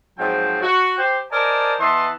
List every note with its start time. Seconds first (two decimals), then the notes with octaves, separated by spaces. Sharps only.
0.18 G#2 F3 F#3 C4 G5 A5
0.62 F#4
0.98 G4 C5
1.32 A#4 C5 D5 D#5 G#5 A5
1.80 E3 B3 D#5 A5 C6